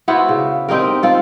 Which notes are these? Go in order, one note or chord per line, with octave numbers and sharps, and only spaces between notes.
B3 E4 F#4 C5
C#3
C4 D#4 G4 A#4
C4 F4 A4